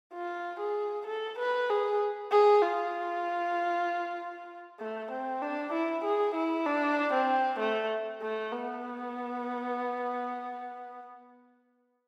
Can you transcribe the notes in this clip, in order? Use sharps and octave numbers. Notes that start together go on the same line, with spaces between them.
F4
G#4
A4
B4
G#4
G#4
F4
A3
C4
D4
E4
G#4
E4
D4
C4
A3
A3
B3